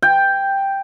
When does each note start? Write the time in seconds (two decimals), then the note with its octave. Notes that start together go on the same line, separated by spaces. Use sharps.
0.02 G5